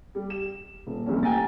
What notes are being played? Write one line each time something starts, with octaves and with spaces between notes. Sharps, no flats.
G3
E7
D#1
F1 C2 A#2 C#4
G5 G#5 A#5 A6